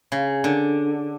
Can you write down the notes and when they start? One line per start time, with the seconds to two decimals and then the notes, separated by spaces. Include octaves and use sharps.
0.12 C#3
0.44 D3